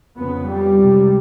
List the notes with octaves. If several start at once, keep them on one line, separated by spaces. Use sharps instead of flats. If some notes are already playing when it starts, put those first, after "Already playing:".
F2 C#3 B3
G3
C#2 C3